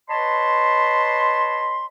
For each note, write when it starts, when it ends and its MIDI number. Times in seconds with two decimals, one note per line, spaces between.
0.10 1.86 71
0.10 1.86 73
0.10 1.86 75
0.10 1.86 81
0.10 1.86 83
0.10 1.86 84